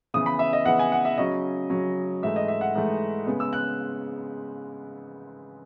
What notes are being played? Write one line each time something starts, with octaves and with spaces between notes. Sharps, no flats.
C#3 E3 B3 D#6
B5
E5
D#5
C#3 E3 B3 F#5
G#5
F#5
E5
C#3 F#3 C#4 D#5
C#3 F#3 C#4
G#2 E3 A3 E5
D#5
E5
F#5
G#2 E3 A3
C#3 G#3 B3
E6
F#6